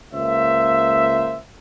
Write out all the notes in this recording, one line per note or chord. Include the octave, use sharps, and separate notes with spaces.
C#2 A#3 C5 E5